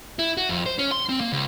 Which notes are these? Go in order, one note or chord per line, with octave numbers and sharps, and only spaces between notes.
E4
F#4
F2
C5
C#4
C6
C4
A#3
C#2